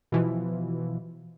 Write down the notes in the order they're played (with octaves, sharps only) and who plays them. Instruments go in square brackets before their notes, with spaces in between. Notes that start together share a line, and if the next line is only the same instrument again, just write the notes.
[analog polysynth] B2 E3 F3